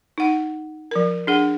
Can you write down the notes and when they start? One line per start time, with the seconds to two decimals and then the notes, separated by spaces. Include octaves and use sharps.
0.18 D#4 F#5
0.91 F3 A#4
1.27 D4 G#4 F#5